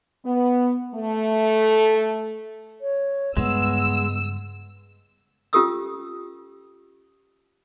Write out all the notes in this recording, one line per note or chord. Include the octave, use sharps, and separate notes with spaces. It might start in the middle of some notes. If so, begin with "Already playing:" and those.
B3
A3
C#5
G2 C#3 G#3 B3 E6
C#4 F4 G4 A4 D#6 E6